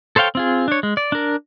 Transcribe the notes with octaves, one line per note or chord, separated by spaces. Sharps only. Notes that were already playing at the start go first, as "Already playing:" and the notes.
A4 C5 C#5 F5 G5
C4 F4 G#4
D4 C#5
G#3
D5
D4 A#4